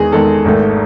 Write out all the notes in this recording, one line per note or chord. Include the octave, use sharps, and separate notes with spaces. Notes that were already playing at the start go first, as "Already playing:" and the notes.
Already playing: E2 D#3 G#3 G#4
E2 D#3 G#3 A4
G#1 G#2 D#3 A3